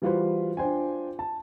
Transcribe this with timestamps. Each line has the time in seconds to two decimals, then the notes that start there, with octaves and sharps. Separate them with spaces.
0.02 E3 G3 F4 F#4 B4 C5
0.57 D4 F4 C5 G5 G#5
1.19 A5